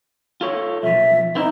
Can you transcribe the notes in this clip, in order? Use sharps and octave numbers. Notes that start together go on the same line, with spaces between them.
F4 A4 C#5
B1 F3 E5
B3 C4 D#4 E4